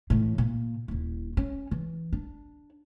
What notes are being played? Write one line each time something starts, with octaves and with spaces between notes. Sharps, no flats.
A2 E3
A#2
D#1 E4
C#4
E3
D4